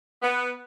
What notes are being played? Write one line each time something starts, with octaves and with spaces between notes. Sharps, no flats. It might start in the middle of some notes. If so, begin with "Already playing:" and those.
B3